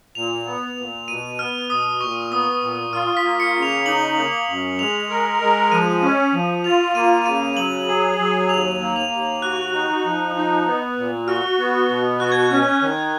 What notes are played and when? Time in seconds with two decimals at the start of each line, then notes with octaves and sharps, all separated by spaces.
0.15 A#2 F7
0.46 B3
0.78 A#2
1.08 B2 D#7
1.39 B3 F6
1.70 B2 D#6
2.01 A#2 C#6
2.32 B3 D#6
2.62 A#2
2.93 F4 F6
3.17 B6
3.24 A#3
3.40 C#7
3.55 C#3
3.62 F7
3.86 D#4 F#7
4.17 A#3
4.48 F#2
4.79 G#3 F7
5.10 A#4
5.41 G#3
5.72 F3 D#7
6.02 C#4
6.33 F3
6.64 F4 F7
6.95 A#3 D#7
7.25 C#3 D#7
7.56 F#3 F#7
7.88 G#4
8.18 F#3
8.49 D#2 F7
8.81 A#3
8.96 F7
9.11 D#2
9.42 F#4 F#6
9.73 D#4
10.04 F3
10.35 D#4
10.66 B3
10.97 A#2
11.27 F#4 F6
11.59 B3
11.89 B2
12.20 F#4 F#6
12.32 G#6
12.43 F#6
12.51 C#4
12.81 D#3